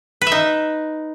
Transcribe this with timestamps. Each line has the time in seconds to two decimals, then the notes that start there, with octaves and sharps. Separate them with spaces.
0.21 B4
0.27 E5
0.32 D#4